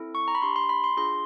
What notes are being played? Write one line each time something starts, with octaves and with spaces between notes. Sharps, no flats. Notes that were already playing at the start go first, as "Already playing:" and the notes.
Already playing: C4 E4 A4
C#6
A#5
B5
D4 G4 C6
C6
B5
C6
D4 F4 G#4 C6